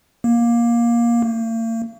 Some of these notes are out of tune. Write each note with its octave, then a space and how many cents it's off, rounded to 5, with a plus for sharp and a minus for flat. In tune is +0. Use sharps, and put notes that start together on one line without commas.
A#3 +15
A#3 -45